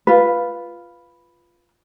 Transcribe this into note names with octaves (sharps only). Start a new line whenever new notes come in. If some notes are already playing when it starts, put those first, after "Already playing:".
F4 B4